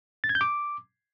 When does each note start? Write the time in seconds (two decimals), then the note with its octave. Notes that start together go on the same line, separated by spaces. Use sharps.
0.24 A6
0.29 G#6
0.35 G6
0.41 D6